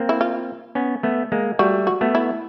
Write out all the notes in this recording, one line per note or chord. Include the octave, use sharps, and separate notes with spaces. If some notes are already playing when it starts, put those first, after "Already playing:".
Already playing: A#3 C4
E4
F4
B3 C#4
A3 B3
G#3 A#3
G3 A3 F#4
F#4
A3 B3
E4